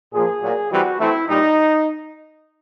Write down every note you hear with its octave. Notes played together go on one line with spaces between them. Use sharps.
A#2 F3 A#3 G#4
A#2 F#3 A#3
E3 G3 C4 F#4
E3 A3 C4 E4
A#2 G3 D#4